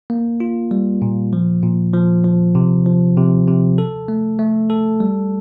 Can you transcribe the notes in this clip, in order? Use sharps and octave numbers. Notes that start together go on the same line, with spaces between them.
A#3
F4
G3
A#2
F3
A#2
F3
F3
C3
F3
C3
C3
A4
A3
A3
A4
G3